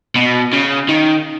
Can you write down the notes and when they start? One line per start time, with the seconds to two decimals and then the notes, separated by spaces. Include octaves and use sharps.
0.16 B2
0.53 C#3
0.89 D#3